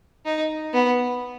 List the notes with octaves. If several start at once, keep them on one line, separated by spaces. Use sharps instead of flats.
D#4
B3